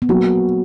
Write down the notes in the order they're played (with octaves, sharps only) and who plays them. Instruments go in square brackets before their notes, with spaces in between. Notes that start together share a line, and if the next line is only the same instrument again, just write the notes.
[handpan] B3
[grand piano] F#3 [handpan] A#3